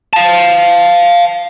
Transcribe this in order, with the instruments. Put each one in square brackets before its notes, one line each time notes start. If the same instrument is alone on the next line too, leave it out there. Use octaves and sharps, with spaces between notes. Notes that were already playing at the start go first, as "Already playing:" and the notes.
[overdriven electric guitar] F5 A5